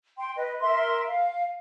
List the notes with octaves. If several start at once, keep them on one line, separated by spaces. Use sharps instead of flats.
G5 C6
B4 D#5
A#4 E5 C6
F5